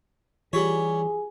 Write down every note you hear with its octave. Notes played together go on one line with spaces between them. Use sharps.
E3 G3 F4 G4 G#4 C#5